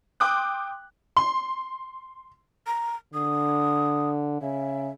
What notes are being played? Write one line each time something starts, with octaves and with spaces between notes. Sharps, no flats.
G5 C6 D6 D#6 F#6
C6
A#5
D3 D#6
C#3 E5